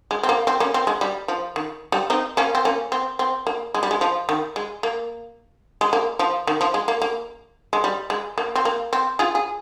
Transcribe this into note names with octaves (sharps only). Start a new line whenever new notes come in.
G#3
C4
A#3
C4
A#3 C#4
C4
G#3
G3
F3
D#3
G3
C4 D#4
A#3 C#4
C4
A#3 C#4
C4
C4
A#3
G#3
G3
G#3
F3
D#3
G#3
A#3
G#3
A#3
F3
D#3
F3
G#3
A#3
A#3
G#3
G3
G#3
A#3
C4
A#3
C4
F4 G#4
G#4